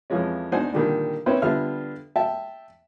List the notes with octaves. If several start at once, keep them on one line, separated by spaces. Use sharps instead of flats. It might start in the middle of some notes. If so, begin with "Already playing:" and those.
F2 E3 F3 G#3 C#4
E2 D4 D#4 C5 F#5 G#5
A#2 D3 D#3 G3
C4 C#4 D#4 E4 B4 C5
D3 G3 B3 F4 E5 F6
E5 G5 A5